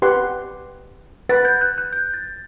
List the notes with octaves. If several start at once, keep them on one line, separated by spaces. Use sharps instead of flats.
G4 B4 F#5 C6
B4 F#5 B5 A6
G6
F#6
F#6
G6
A6